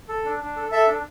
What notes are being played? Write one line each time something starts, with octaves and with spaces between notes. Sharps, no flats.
A4
D4
D4
A4
A4 E5
D4